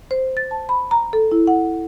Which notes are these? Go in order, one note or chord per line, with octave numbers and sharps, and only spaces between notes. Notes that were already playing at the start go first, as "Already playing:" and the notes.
C5
A6
A5
B5
A#5
A4
E4
F#5